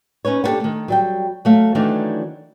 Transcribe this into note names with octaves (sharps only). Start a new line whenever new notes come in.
C#4 D#4 B4 C#5
B3 D4 F#4 G4 A4
D#3 A3
F#3 G3 G5
F#3 A3 F5
D#3 E3 F#3 A3 D4 D#4